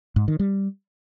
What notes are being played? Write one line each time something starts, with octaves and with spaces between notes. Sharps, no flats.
G#2
D#3
G3